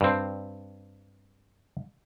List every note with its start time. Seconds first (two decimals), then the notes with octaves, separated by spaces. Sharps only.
0.01 G2 C4